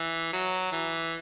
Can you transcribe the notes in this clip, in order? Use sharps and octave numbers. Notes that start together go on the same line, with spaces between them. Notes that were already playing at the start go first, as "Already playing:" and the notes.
Already playing: E3
F#3
E3